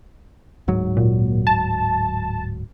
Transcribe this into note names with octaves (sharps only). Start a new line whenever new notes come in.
D1 G#2 F#3
A#2
A5